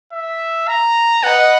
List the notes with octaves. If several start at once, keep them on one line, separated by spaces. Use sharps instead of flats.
E5
A#5
B4 D#5 F#5